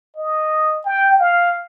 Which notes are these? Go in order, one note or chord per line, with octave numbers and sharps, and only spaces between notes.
D#5
G5
F5